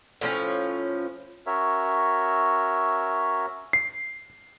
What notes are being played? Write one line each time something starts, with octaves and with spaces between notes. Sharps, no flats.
A2 F3 C#4
C#4 F#4 A#4 C#5 E5
C7